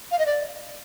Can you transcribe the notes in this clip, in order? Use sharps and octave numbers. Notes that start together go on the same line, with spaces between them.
F5
D#5
D5